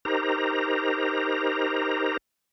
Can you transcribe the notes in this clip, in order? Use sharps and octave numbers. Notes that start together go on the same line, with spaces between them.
D#4 G4 A#4 C5 A#5